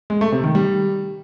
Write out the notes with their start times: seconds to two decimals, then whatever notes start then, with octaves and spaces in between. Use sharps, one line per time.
0.10 G#3
0.21 A3
0.32 C3
0.44 D#3
0.55 G3